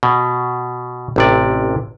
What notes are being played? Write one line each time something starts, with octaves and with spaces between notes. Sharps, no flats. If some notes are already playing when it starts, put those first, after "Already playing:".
B2
A1 C3 D5